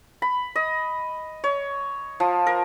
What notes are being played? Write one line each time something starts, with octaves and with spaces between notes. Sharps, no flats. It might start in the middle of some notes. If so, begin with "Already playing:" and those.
B5
D#5
C#5
F3
A#4